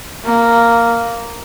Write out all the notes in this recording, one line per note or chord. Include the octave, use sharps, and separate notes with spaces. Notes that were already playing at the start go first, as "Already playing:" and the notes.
A#3